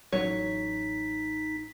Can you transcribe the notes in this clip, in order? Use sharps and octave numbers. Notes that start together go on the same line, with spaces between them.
A1 F#3 C#4 D#4 C#5 B6